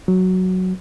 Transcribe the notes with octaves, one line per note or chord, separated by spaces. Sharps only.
F#3